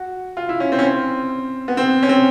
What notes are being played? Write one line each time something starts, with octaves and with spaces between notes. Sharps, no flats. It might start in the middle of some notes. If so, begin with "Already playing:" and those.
Already playing: F#4
F4
E4
C#4
C4
C#4
C4
B3
C4
C#4
C4